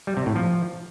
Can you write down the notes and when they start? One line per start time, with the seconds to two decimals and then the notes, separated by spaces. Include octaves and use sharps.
0.07 G3
0.17 C3
0.26 A2
0.36 F3